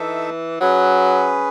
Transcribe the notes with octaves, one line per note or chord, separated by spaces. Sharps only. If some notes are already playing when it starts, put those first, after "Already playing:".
Already playing: E3 D#4 A4 E5
F#3 C#4 G#4 B4